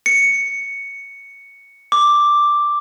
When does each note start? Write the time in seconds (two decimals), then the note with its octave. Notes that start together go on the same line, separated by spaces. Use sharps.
0.06 C#7
1.92 D6